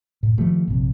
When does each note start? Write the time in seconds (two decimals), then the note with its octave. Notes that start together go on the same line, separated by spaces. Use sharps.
0.23 A2
0.38 D#3 F3 G3 A3
0.67 A#1 G2 C3